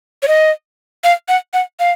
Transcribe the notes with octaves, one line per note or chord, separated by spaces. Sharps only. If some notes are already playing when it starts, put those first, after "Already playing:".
C#5
D#5
F5
F#5
F#5
F5